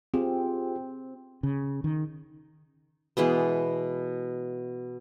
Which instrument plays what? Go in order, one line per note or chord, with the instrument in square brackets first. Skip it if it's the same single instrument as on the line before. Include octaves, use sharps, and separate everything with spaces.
[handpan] C4 [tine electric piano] F4 G4 G#4
[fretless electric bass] C#3
D#3
[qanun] B2 E3 G#3 B3